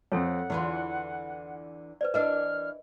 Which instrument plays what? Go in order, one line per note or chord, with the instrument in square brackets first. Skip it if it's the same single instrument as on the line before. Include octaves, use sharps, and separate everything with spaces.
[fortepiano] F2 C4 [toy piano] A4 C#5 [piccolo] F#5
[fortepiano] E2 [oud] D3 E3 F4
[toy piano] B4 C5 D5
[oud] E3 D4 [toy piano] A#4 B4 D#5 [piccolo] F6